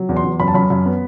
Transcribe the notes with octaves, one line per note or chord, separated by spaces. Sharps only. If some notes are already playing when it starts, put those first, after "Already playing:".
Already playing: F#3
E2
C6
E2
F#2 B5
A5
F#2 B5
F#2
B3